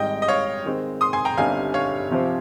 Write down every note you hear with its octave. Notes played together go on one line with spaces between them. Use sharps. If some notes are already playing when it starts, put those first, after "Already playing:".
Already playing: G#1 G#2 G3 D#5 G5
D#5
C#5 F5
D#3 G#3 C4
C6 D#6
G#5 C6
G5 A#5
G1 G2 G3 C4 D#4 F5 G#5
C#5 F5
C3 F3 C4 G4 C5